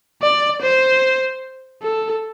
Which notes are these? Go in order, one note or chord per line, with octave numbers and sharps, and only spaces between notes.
D5
C5
A4